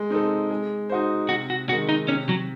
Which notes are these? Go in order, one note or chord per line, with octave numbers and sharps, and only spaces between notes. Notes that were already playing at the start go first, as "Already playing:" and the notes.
Already playing: G#3
C4 D#4 A4
G#3
D#4 F#4 C5
C3 F#4
F#4
D#3 G#3 F#4
D#4
C3 C#4
F#3